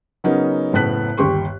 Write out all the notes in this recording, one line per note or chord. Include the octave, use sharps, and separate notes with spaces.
C#3 F#3 B3 C#4 D#4 A#4
F#1 A2 B3 A5 F#6 B6
G1 D#2 G4 C6 C#6